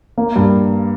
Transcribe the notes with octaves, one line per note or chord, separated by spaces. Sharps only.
A#3
G2